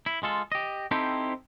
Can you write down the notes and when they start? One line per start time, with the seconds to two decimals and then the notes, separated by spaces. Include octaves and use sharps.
0.06 E4
0.23 G#3 F4 A4
0.52 G4 D#5
0.91 C4 D#4 E4 G4 A4 C5